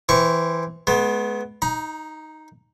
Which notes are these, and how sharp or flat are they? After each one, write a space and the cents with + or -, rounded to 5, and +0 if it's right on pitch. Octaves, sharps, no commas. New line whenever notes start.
E3 +0 C4 -15 C#6 +0
G#3 +40 B3 +0
D#4 +0 A#5 +35